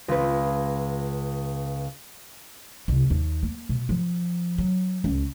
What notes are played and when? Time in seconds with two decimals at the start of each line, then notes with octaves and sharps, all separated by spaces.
0.08 C#2 B4
2.88 C2
3.10 D#2
3.43 A#3
3.69 B2
3.89 F3
4.58 F#3
5.04 C#2